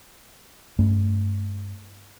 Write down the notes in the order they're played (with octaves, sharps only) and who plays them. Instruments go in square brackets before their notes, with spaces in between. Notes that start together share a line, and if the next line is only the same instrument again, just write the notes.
[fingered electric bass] G2 A3 C#4